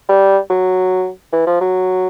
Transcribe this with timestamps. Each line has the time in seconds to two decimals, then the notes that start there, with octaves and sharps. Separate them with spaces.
0.09 G3
0.50 F#3
1.33 E3
1.46 F3
1.61 F#3